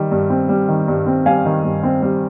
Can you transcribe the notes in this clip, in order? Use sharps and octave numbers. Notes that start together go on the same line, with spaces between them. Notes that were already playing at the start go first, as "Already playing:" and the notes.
Already playing: D#3 G3
G2
C4
G3
D#3
G2
C4
G3 F5 G#5
D#3
G2
C4
G3